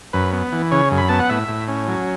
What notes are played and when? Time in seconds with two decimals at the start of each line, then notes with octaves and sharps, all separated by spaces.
0.13 F#2 B4
0.33 B3
0.52 E3
0.71 C#3 C#5
0.91 F#2
0.98 B5
1.09 B3 A5
1.19 F#5
1.29 A2 E5
1.49 A2
1.68 C#4
1.88 F#3